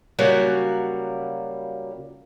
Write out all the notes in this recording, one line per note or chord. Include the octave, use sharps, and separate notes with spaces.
C#3 F#3 G3 A#3 F#4 F#5